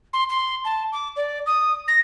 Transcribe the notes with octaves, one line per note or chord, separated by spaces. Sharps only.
C6
C6
A5
D6
D5
D#6
A#6